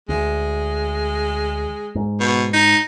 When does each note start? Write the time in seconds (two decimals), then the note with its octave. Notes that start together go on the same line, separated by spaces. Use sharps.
0.09 D2 G#3
1.95 G#2
2.20 B2
2.53 D#4